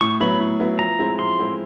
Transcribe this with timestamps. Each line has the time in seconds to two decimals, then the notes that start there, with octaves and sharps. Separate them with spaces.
0.01 A2 C#6
0.20 F#3 B3 E4 B5
0.40 A2
0.60 F#3 B3 E4
0.79 F3 A#5
0.99 G#3 C4 E4
1.18 F3 C6
1.38 G#3 C4 E4